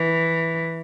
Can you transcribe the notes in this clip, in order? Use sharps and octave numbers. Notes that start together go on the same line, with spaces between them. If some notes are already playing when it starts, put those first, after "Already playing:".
Already playing: E3